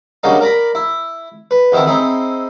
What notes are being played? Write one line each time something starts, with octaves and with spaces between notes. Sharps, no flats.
C#3 F#3 G3 A#3 D4 D#4
A#4 D5 A#5 B5
E4
B4
E2 D#3 C4 E4 A5
C4 D#4 E4 G#4